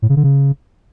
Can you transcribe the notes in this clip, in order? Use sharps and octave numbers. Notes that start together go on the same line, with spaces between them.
A2
C#3
D3
C#3